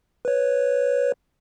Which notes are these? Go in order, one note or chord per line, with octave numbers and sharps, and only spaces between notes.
B4 C#5